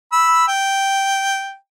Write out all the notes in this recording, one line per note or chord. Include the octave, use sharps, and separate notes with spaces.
B5 E6
G5